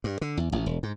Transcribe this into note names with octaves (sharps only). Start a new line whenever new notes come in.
G2
D3
E2
A1
E1
G#2